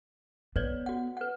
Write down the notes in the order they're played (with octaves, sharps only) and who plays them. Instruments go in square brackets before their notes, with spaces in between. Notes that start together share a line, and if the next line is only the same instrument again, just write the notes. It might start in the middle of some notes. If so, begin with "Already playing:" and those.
[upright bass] B3 [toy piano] B4 C#5 D5
[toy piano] F#4 F#5
B4 F#5